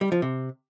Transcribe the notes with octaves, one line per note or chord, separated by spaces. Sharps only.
G3
F3
C3